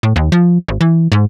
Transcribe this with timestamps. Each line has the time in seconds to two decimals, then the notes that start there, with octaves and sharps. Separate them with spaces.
0.03 A2
0.16 D#2
0.32 F3
0.68 G#1
0.81 E3
1.12 G#2